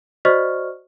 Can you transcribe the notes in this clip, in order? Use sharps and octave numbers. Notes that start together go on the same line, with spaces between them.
F#4 C5 D5 D#5 C#6 F6